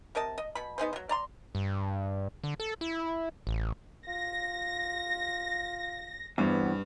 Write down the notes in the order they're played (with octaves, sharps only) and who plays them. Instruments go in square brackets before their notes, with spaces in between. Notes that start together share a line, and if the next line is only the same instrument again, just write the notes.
[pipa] C3 A#4 D#5 A5
D#5
B2 B5
B3 D#4 G#4 C5
F3 F#3
D5 A#5 C6
[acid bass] G2
D3
A4
E4
A1
[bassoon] F4 [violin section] A#6
[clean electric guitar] E2 [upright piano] G2 [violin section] B3 [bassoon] C4